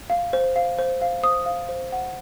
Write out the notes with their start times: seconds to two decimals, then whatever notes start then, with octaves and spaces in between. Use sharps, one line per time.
0.10 F5
0.33 C5
0.56 F5
0.78 C5
1.02 F5
1.23 C5 D#6
1.46 F5
1.69 C5
1.92 F#5